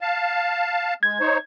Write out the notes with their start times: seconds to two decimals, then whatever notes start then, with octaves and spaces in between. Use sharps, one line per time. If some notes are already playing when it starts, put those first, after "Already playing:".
0.01 F5 A5
1.03 G#3 G#6
1.20 D#4 C5 C#5